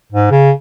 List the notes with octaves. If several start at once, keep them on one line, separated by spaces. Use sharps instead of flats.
G#2
C#3